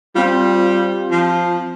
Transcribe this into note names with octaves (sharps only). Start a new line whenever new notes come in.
G3 C4 F4
F3